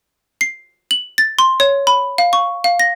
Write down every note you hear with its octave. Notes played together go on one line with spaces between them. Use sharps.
C7
F#7
A6
C6
C#5
B5
F5
C#6
F5
A#6